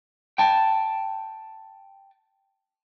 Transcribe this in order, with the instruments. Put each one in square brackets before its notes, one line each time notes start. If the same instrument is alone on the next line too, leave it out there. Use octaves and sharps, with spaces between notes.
[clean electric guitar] G5 A5